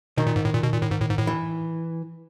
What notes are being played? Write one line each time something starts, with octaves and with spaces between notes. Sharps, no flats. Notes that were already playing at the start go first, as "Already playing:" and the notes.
B2 D#3
A#2
G#2
A2
A#2
B2
A#2
A2
G#2
A2
G#2
A2
E3